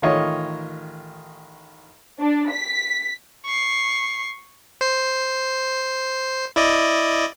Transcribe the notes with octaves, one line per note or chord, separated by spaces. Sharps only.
A1 D#3 F4 C#5 D#5
D4
B6
C#6 C7
C5 C7
E4 D5 D#5